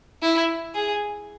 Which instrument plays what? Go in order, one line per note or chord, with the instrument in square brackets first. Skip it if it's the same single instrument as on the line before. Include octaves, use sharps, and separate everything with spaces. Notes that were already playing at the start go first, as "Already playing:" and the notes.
[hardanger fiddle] E4
G#4